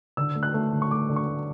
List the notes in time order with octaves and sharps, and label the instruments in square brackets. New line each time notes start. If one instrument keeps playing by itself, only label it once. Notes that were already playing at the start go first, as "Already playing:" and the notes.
[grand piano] D3 E6
A3
F#6
A3
D3
C#6
A3 D6
D3
C#6
A3